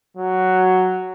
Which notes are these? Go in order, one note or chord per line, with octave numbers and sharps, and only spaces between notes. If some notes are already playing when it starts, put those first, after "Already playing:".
F#3